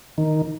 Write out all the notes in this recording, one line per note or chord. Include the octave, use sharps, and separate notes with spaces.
D#3